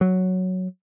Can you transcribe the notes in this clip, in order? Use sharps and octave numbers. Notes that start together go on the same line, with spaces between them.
F#3